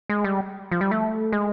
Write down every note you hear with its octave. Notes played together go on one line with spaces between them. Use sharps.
G#3
G3
F3
G3
A3
G#3